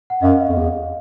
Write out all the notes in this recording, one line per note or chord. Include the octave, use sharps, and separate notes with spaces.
F#5
F#2 D#5 F5
F2
E2